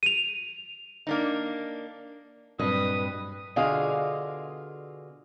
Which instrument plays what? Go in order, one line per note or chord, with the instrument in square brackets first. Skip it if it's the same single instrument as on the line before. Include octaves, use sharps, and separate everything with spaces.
[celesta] D#7 F7
[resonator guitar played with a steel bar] A#3 D4 D#4
[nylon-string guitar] G2 D#5 [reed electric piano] A#2 F#3 C4 [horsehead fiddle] B4 [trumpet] D#6
[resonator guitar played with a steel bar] B2 D3 F4 G#4 D#5 F5